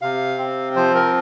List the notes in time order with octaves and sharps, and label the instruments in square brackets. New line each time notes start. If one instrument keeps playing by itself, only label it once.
[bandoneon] C3 F5
C4
F3 C5
A#4